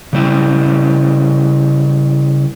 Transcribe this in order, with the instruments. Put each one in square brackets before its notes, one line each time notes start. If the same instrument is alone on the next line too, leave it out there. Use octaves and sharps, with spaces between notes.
[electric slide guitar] C#3 G3 E4